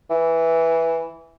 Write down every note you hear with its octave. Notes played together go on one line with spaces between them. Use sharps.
E3